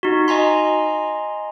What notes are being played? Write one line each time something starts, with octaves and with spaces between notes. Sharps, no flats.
D#4 F#4
D#5 G#5 A#5 C6